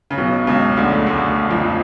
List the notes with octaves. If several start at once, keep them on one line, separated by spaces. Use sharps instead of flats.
C#3
B1 B2
C#2 C#3
D2 D3
D2 D3
F2 F3